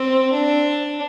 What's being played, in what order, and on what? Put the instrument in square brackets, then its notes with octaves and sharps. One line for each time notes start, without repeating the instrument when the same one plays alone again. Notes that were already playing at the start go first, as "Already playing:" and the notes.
Already playing: [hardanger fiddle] C4
D4